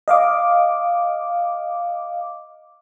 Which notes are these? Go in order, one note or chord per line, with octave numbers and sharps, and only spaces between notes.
D#5 F5 D6